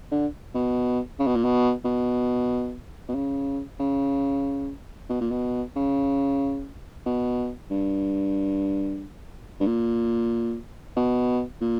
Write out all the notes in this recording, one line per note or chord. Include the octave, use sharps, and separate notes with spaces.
D3
B2
C#3
B2
A#2
B2
B2
B2
C#3
C#3
B2
A#2
B2
C#3
B2
G2
G2
A#2
B2
A#2